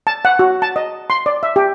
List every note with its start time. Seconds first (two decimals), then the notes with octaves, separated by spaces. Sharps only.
0.07 A5
0.25 F#5
0.39 F#4
0.62 A5
0.76 D#5
1.10 C6
1.26 D5
1.43 E5
1.56 G4